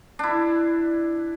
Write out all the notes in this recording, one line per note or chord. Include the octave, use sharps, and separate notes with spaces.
D4 E4